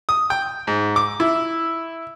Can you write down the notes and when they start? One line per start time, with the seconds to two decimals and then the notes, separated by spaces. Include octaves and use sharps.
0.09 D#6
0.30 G5
0.67 G#2
0.96 D6
1.20 E4